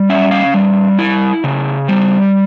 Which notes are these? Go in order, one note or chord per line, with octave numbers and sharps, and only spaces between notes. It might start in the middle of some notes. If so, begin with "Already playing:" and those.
Already playing: G3
C#4 E5
F5
G3
E4
C#3
G3